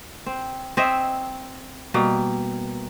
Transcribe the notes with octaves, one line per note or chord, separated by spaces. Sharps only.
C4
C4 C#5 D#5 E5
B2 G3 A#3